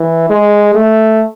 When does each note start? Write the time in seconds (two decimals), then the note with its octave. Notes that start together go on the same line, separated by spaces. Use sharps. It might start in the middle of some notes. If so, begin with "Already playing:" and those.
Already playing: E3
0.30 G#3
0.75 A3